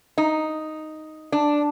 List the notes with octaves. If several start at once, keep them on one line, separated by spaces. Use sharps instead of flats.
D#4
D4